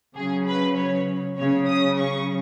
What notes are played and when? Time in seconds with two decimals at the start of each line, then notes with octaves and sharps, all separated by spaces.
0.15 C#3 F#3 G#4
0.46 B4
0.77 C#5
1.37 C#3 F#3 C#5
1.67 D#6
1.97 C#6